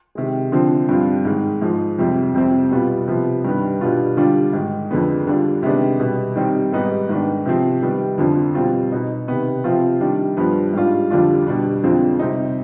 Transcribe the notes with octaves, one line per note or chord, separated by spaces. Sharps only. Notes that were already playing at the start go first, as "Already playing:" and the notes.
C3 D#3 G#3
D3 F3 C4
G2 F3 C4 F4
G#2 D#3 G#3
G#2 F3 G#3
F2 C3 G3 C4
F2 C3 G3 C4
B2 G3 B3 F4
C3 F3 B3
G2 D#3 B3
B2 G3 B3 D4 F4
D3 G3 D4 F4
G#2 D#3 G#3
F2 D3 G#3 B3
D3 G3 D4 F4
C3 D#3 G#3 B3 D4
B2 G3 B3
D#3 G3 C4 D#4
G#2 G3 B3 D#4
G#2 D#3 B3 D4
C3 F3 C4
D#3 G3 B3
F2 D3 F3
B2 G3 C4 F4
B2 B3 D#4
C3 D#3 B3
C3 F3 C4 F4
D#3 G3 D4
G2 F3 B3
G#2 G3 D4 F4
F2 D3 G3 D4 F4
B2 G3 D4
F2 D3 G#3 C4 F4
C3 G3 C4 D#4